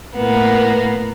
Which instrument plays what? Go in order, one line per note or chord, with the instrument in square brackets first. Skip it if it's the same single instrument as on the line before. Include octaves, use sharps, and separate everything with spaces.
[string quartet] A2 A#3 B3